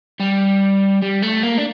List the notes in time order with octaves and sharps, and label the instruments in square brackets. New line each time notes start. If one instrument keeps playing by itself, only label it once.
[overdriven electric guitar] G3
G3
A3
A#3
D4